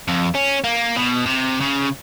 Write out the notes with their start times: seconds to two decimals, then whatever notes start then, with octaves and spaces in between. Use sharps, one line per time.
0.08 F2
0.35 C#4
0.64 A#3
0.97 B2
1.26 C3
1.61 C#3